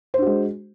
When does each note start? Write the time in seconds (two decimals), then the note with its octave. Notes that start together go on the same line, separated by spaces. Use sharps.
0.14 C5
0.18 D4
0.22 F#4
0.26 G#3